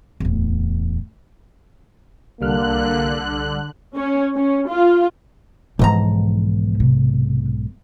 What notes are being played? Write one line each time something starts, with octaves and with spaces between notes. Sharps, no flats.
D1 E2
C2 D3 G3 A#3 F6 F#6
C#4
C#4
F4
B1 G#2 E3 F3 A#5
C3